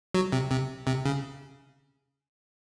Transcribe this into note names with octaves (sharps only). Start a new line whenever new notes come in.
F#3
C3
C3
C3
C#3